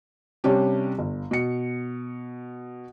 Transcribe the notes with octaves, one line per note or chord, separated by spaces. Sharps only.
C3 G3 C#4 D4 G4
G1
B2 C#7